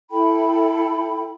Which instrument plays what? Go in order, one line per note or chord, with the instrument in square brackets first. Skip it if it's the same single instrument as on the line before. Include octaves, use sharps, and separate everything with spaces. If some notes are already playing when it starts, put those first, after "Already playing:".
[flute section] E4 A4 G5 B5